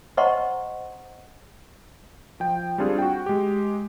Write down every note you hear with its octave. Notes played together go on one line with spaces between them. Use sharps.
C5 D#5 F#5 A#5 C6 C#6
F3 G5
G3 C4 D4 F4 G#4
F#4 G5
G#3 G4